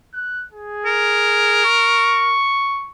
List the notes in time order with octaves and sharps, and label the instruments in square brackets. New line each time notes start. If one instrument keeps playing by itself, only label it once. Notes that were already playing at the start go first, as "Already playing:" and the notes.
[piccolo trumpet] F#6
G#4
[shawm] A#4
[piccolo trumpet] C#6